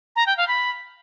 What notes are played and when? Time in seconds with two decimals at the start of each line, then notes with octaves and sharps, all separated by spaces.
0.16 A#5
0.27 G5
0.37 F5
0.48 B5